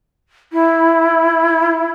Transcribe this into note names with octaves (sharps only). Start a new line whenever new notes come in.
E4